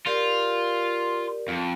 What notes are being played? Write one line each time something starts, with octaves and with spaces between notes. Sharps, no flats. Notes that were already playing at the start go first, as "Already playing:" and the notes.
F4 G4 A#4 D5
F2